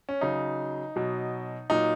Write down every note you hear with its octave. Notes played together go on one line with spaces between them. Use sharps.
C#4
C#3 F#3 D#4
B2 F#3
A#2 F#3 D#4